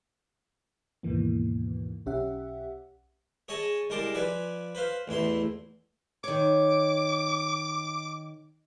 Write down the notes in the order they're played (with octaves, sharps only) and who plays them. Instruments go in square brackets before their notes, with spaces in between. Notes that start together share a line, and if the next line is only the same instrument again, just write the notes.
[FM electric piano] D#2 G#2 B2 E3 A#3
B1 C#4 G4 E5 F#5
[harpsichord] G#4 C#5 D#5 G#5 A5
C2 G#3 A#4 A5 C6 D6
F3 B4 D5 G#5
B4 C5 F5
A1 E2 E4 C6
[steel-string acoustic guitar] D#3 C#5 [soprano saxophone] D6